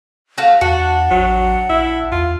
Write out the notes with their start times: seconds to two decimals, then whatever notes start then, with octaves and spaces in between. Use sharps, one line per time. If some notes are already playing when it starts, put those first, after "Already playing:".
0.38 A3 F#4 F5
0.61 E2 D4 F#4 F#5
1.10 A1 F#3
1.70 A#1 E4
2.12 E2 F4